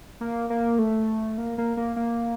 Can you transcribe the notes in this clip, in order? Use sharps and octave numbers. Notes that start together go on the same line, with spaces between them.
A#3
A#3
A3
A#3
A#3
A#3
A#3